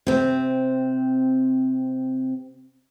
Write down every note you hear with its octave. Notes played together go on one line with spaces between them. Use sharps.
C3 C4